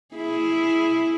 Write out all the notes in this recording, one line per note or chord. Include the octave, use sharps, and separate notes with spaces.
E4 G#4